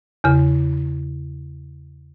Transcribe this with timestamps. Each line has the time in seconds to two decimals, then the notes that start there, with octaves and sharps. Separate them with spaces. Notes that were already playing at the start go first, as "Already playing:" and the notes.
0.24 E2 C#3